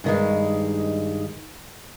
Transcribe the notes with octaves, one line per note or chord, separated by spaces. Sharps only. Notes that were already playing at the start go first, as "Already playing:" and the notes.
G2 D#3 G#3